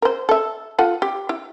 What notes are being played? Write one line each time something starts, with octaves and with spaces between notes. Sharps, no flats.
A#4 C5
A4 E5
F4 A4 F#5
G4
E4